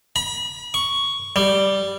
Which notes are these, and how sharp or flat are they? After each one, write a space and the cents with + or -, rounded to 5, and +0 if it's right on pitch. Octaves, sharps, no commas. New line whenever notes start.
B5 -40
C#6 +5
G3 -5